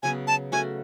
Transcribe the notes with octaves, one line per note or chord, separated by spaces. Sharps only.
C#3 F#3 B3 G#5
A5
A3 C#4 F#4 G#5